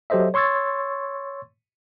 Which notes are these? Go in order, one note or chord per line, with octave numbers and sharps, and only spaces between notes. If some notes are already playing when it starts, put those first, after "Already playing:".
F#3 G4 A4 C5 D#5 E5
C#5 C6 C#6 E6 G#6 A6